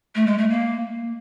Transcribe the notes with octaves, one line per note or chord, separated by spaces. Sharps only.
A3
G#3
A3
A#3